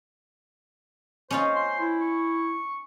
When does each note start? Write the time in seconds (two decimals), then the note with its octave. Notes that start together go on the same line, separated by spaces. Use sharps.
1.31 C#4 D#4 F4 C5
1.55 C6
1.80 E4
2.01 C#6